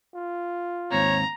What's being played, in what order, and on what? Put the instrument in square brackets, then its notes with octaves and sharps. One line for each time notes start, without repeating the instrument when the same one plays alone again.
[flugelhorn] F4
[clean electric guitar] D#2 G#2 C4 [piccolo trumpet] C#5 [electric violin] A#5